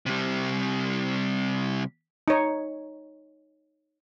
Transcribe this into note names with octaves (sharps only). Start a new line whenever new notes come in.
C3 G3
D#4 C#5